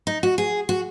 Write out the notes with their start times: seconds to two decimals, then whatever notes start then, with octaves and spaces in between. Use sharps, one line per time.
0.07 D#4
0.23 F#4
0.38 G#4
0.69 F#4